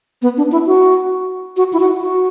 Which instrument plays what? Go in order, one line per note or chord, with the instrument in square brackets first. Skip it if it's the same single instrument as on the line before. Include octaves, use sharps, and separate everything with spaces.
[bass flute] B3
D4
E4
F#4
F#4
E4
F#4
F#4